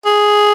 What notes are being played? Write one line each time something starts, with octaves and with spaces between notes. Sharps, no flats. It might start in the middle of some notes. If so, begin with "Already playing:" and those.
G#4